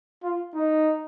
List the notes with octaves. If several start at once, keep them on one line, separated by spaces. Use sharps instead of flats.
F4
D#4